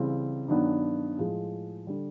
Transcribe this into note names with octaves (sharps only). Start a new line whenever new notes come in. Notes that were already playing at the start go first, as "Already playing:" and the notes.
Already playing: C#2 C#3 E3 G3 C4
G2 D#3 F#3 B3 D4
A2 F3 G#3
D3 G3